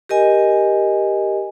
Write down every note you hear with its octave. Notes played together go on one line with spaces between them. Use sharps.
G4 A#4 D#5 G#5